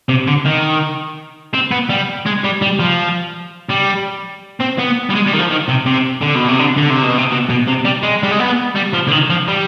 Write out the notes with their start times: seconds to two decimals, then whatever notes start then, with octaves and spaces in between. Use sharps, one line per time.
0.09 C3
0.27 D3
0.45 D#3
1.54 C4
1.71 B3
1.90 G3
2.26 G#3
2.44 G3
2.62 G3
2.79 F3
3.70 G3
4.60 C4
4.78 B3
5.10 G3
5.15 G#3
5.27 G3
5.33 D#3
5.39 F3
5.50 D#3
5.68 C3
5.86 C3
6.22 D3
6.36 B2
6.48 C3
6.59 D3
6.77 D3
6.90 C3
7.03 B2
7.17 C3
7.31 B2
7.49 B2
7.68 C3
7.85 G3
8.03 G#3
8.23 G3
8.31 G#3
8.39 B3
8.75 G3
8.93 F3
9.07 D3
9.11 D#3
9.30 F3
9.48 G3